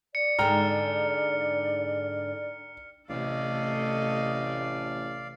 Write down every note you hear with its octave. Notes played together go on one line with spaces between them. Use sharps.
D5 C#7
G#2 D3 G5 A#5 F6
A1 C3 A3 A4 D5 D#5 F5